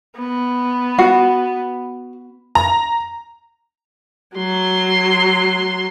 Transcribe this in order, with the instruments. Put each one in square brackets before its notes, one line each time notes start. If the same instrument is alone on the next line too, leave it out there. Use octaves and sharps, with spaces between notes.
[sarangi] B3
[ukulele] F#4
[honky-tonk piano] A#5
[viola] F#3 C6